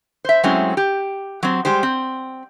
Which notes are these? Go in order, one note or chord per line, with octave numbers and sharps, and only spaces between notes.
C5 E5
F#3 G#3 A3 C4 C#4 E4
G4
F#3 C4
G3 G#3 G4 C5
C4